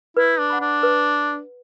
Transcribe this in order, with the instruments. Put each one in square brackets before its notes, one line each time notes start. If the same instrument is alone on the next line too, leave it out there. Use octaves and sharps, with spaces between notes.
[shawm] E4 [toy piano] B4
[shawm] D4
[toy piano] F#5 B5
[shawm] D4
[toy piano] B4